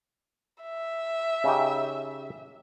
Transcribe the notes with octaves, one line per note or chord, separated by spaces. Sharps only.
E5
C#3 D#4 G4